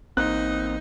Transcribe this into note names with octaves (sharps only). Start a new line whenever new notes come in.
A1 A#3 C4 D#4 F#6